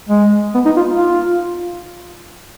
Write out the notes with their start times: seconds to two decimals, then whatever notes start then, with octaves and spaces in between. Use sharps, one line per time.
0.09 G#3
0.55 B3
0.66 D#4
0.77 F4
0.89 F4